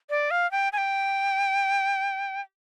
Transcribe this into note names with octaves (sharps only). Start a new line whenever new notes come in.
D5
F5
G5
G#5
G5